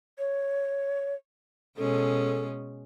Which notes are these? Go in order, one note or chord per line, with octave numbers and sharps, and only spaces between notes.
C#5
B2 G#3 C#4 A4